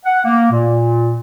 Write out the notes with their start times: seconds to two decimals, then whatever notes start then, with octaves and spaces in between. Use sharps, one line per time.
0.05 F#5
0.25 A#3
0.52 A#2